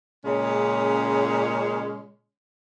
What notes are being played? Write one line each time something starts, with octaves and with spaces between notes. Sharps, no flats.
A#2 C#3 G#3 C#4 C#5